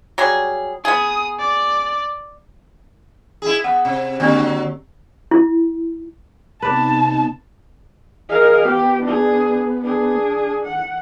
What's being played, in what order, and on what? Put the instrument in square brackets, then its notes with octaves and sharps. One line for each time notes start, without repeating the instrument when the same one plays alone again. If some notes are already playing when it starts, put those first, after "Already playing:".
[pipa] F#3 G3 G#4
[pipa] B3 G#4 [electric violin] D#6
[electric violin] D5
[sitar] E4 G#4
[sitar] B3 [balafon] F#5
[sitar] C3
[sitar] D3 F#3 [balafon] A#3 C4 G4
[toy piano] E4
[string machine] C3 B3 D#4 [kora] B4 D5 [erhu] A5
[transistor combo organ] G#4 D#5 [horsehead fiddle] A#4 F5
[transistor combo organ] B3 [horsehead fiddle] G4
[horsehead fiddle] D4 G#4
D4 G#4
F#5